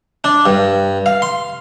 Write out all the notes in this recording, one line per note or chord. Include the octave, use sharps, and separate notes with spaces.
D4
G2
F5
C6